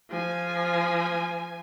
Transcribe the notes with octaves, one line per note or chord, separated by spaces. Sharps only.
F3 G#5